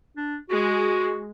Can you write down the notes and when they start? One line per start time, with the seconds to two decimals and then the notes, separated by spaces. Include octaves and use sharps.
0.17 D4
0.49 G#3 F#4